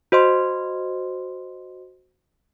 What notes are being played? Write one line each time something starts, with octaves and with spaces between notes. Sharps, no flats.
F#4 C5 D#5 C6